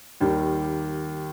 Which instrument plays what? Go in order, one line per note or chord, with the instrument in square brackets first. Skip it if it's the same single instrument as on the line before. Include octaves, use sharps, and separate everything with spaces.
[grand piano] D#2 D#3 G3